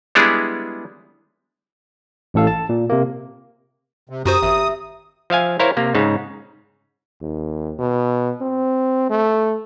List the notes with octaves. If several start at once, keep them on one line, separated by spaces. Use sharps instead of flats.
G3 G#3 B3 D4 E4 G#4
A1 A2 A4 F5
A5
A#2
C3 A#3
C3
F#2 F#4 G4 C5 A#5 D#6
G#1 E5
F3 E5 F5 G#5
E4 A#4 C5 C#5 F5
C3 A#3
G#2 C#3 D#4
D#2
B2
C4
A3